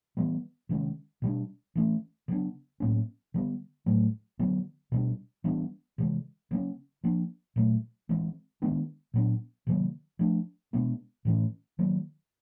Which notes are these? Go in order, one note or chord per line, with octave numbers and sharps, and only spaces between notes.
E3 G3 B3
C3 D#3 G#3 C#4
B2 G3 B3 D4
E3 A3 C#4
C#3 F#3 B3 D4
A2 F#3 A#3 C#4
D3 G3 B3
A2 F#3 A3
D3 F#3 B3
B2 G3 B3 D4
E3 G3 B3 D4
C3 E3 G#3
C#3 F#3 A#3 C#4
F3 A#3 D4
A#2 F#3 A3
E3 G#3 C4
D#3 G#3 B3 D4
A#2 F#3 B3 D4
C3 D#3 F#3 A#3
F3 A3 D4
B2 G#3 B3 D4
A2 E3 A3 C#4
D#3 F#3 A#3